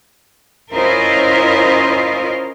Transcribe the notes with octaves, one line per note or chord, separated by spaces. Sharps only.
C#4 E4 F4 A#4 C5 D#5